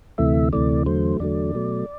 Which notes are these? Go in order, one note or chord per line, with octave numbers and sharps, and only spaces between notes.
D2 C3 E3 A3 E5
D2 C3 E3 A3 D5
E2 D3 F#3 A3 C5
E2 D3 F#3 A3 D5
B2 F#3 A3